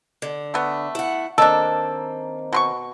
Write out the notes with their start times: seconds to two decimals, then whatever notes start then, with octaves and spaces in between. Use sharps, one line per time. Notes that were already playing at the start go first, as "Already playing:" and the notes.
0.22 D3
0.54 A3 B3
0.95 E4 F#5
1.38 D#3 A#3 C4 D4 A4
2.53 B2 C6 C#6